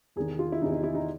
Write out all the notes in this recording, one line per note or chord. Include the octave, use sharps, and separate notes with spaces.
E2 C3 D#3 G#4
F4
E4
E2 C3 D#3 D#4
D#4
E4
D#4